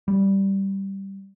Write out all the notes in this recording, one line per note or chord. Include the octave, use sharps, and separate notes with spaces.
G3